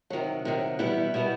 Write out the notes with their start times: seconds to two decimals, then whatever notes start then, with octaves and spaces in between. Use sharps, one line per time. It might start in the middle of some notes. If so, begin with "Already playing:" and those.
0.10 C3 D#3 F#3
0.45 C3 D#3 F#3
0.79 E2 B2 G3 B3 E4
1.14 B2 G3 B3 E4